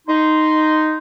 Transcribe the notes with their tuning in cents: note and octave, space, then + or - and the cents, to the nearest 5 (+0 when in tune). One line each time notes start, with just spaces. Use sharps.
D#4 +0 C6 -10